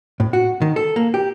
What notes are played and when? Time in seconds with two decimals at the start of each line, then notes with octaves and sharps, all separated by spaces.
0.20 A2
0.33 F#4
0.62 D#3
0.76 A4
0.96 A#3
1.14 G4